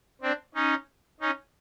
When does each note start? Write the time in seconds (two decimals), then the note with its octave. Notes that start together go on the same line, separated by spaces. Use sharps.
0.22 C4 D4
0.55 C#4 D#4
1.20 C#4 D#4